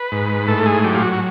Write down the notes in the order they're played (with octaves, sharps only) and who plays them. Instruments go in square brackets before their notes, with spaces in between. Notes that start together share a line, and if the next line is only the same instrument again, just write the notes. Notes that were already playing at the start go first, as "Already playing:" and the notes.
Already playing: [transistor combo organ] B4
G#2
A2 A4
G#4
F#3 G4
F4
F#4
F#4